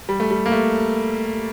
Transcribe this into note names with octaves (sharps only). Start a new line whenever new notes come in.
G3
A3
G3
A#3
A3